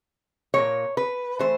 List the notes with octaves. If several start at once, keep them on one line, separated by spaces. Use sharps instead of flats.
A#2 F#3 A#3 C#5
B4
E3 A3 C5